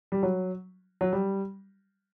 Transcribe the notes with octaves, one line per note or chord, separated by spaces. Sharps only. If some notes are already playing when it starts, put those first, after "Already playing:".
G3
F#3
F#3
G3